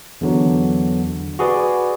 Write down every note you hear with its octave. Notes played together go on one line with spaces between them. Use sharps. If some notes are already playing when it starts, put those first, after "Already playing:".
E2 D3 F#3
F#4 G#4 B4 D5